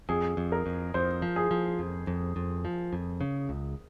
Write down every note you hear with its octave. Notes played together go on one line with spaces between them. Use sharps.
F2 G#4
F2
A#4
F2
F2 C5
F3
G#4
F3
F2
F2
F2
F3
F2
C#3
C#2